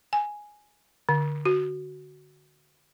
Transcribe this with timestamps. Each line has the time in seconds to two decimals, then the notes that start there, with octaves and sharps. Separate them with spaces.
0.13 G#5
1.09 D3
1.45 F#4